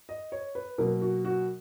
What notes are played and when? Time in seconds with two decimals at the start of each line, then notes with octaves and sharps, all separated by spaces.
0.09 D#5
0.32 C#5
0.55 B4
0.78 B2 F#3 A#3 A#4
1.01 F#4
1.25 F#4